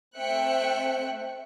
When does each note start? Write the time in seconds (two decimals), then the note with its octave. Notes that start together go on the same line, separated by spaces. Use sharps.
0.17 A3 C4 E5 G5 F#6 C#7